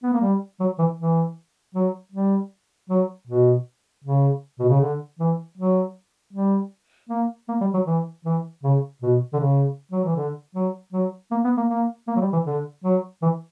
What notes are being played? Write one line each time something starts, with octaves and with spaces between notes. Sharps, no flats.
B3
A#3
G3
F#3
E3
E3
F#3
G3
F#3
B2
C#3
B2
C#3
D3
E3
F#3
G3
A#3
A#3
G3
F#3
E3
E3
C#3
B2
D3
C#3
F#3
E3
D3
F#3
F#3
A#3
B3
A#3
A#3
A#3
F#3
G3
E3
D3
F#3
E3